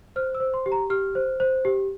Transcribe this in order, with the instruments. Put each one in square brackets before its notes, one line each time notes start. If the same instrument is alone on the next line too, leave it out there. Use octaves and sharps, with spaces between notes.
[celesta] C5 F6
E6
C5
C6
G4
A#5
G4 F6
C5
C5
G4